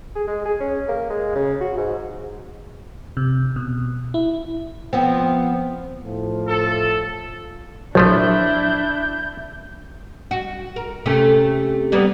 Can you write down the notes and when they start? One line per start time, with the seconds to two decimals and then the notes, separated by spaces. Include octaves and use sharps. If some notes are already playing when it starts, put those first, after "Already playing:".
0.16 G#4
0.27 G#3
0.45 G#4
0.60 C#4
0.88 A#3
1.10 G#3
1.36 C#3
1.61 F#4
1.77 G#2
3.17 C3
3.56 B2
4.14 E4
4.93 F3 B3 C4
6.03 A2 F3
6.47 A4
7.95 A#1 F3 F#3 A3 D4 E4 G6
10.31 F#4
10.76 A#4
11.06 C3 A3 C#4
11.92 G3 A#3 B3